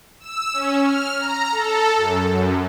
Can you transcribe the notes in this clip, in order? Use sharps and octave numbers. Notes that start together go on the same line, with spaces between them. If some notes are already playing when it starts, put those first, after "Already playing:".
E6
C#4
F6
A#5
A4
F#2
F#2